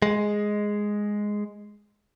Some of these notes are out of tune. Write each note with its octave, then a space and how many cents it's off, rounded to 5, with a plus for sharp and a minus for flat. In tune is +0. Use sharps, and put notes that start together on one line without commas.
G#3 +0